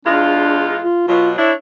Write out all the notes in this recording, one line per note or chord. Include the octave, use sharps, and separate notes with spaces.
E2 G#3 D4 F4
F4
B2 F#3 F4
D4 E4 C#5